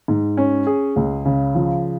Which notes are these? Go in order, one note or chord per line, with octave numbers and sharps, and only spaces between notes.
G#2
C#4
G#4
C#2
C#3
F3